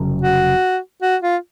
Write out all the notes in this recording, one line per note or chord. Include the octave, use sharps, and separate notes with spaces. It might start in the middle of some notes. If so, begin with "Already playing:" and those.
Already playing: F1 C#3 F#3
F#4
F#4
F4